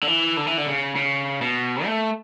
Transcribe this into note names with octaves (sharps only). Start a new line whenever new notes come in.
D3
E3
D3
E3
D3
C#3
C#3
B2
A3